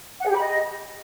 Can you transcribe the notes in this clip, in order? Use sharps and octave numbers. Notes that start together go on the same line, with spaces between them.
F#5
G#4
G4
B5
D#5